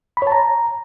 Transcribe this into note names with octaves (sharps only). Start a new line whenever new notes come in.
B5
C#5
A5
A#5